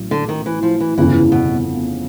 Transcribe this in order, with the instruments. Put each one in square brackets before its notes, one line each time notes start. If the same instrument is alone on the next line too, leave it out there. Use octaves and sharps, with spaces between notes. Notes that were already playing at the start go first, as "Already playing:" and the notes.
Already playing: [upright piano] A1 A2 F#3
[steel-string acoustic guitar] D3
D#3
E3
F3
E3
[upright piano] G1 F2 C#3 [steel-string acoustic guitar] E3
[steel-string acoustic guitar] B2